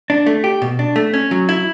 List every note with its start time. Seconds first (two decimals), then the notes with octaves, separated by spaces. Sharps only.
0.10 D4
0.26 A3
0.44 G4
0.62 B2
0.79 D4
0.96 A3
1.14 C#4
1.31 F#3
1.49 E4